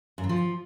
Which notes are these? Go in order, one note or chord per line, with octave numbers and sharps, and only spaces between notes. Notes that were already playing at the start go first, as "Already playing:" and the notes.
F#2
E3
F3